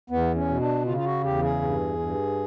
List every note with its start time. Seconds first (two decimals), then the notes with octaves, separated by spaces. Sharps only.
0.10 E2 B3
0.35 C#4
0.48 B2
0.60 D4
0.86 C#3 F4
0.97 F4
1.05 F#4
1.24 E2 G4
1.43 G#4
1.61 G2
1.99 G2